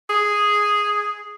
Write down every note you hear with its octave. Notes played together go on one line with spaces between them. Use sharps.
G#4